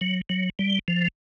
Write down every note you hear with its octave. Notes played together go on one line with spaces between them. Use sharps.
F#3
F#3
G3
F3